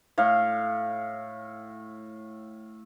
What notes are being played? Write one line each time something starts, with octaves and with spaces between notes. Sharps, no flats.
A2 F5